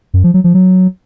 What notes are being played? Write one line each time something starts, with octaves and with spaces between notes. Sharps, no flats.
F#2
F3
F#3
F3
F#3